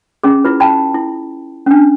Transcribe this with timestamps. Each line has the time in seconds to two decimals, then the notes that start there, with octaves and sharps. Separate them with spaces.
0.23 C#4 G#4
0.44 E4 F4 B4
0.60 G5 A5 B5
0.94 E4
1.66 C#4 D4